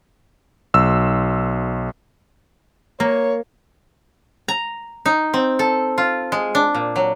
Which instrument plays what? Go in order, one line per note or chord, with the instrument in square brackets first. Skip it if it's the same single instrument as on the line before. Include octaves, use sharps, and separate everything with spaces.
[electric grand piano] B1 E6
[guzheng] A#3 [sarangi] C#5
[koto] A#5
D#4
C4
A4
F4
G#3
D4
A#2
F#3